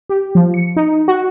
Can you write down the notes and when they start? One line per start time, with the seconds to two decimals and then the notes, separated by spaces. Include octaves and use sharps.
0.09 G4
0.35 F3
0.54 C#7
0.76 D#4
1.08 F#4